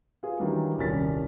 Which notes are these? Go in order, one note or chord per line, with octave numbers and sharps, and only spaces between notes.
F4 G#4 B4
D#3 E3 F#3 G3 D4
D#1 C2 C#4 A#4 A6 B6